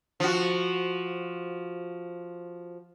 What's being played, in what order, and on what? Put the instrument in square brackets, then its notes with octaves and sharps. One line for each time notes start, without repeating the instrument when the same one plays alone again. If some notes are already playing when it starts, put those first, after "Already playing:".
[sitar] F3 F#4